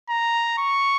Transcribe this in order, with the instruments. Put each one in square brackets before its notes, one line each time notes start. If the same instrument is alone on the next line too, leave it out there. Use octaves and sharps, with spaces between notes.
[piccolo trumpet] A#5
C#6